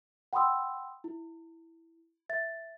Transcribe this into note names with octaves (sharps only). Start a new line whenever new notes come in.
F#5 G5 B5 C6 D#6 E6
E4
E5 A6